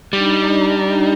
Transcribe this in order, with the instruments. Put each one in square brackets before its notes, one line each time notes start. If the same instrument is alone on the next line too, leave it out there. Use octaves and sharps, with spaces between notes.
[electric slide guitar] G3 [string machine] D4 D#4 A#5